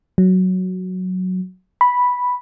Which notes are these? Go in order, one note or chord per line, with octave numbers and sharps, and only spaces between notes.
F#3
B5